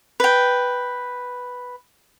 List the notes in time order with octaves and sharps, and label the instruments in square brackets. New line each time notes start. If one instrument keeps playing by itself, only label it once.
[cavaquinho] B4 G5